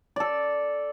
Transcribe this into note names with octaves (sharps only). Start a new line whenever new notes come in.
A4 D5